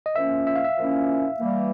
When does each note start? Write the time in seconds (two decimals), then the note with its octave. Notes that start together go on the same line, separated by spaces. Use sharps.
0.06 D#5
0.15 A#2 F3 A#3 C#4 E5
0.47 E5
0.55 F5
0.64 E5
0.78 A#2 F3 A#3 C#4 E4
1.39 E3 G3 A#3